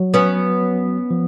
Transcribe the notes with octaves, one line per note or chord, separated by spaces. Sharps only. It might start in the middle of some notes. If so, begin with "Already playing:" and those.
Already playing: F#3
B3 C#4
F3